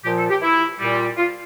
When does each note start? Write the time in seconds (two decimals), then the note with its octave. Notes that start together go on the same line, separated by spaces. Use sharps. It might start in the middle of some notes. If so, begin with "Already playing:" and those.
0.04 A#2 F3 G4
0.17 A4
0.30 G4
0.42 E4
0.80 A#2 G3
1.17 F4